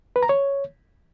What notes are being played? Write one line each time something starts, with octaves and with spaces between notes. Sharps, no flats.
B4
A#5
C#5